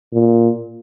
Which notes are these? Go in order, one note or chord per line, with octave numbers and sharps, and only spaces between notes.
A#2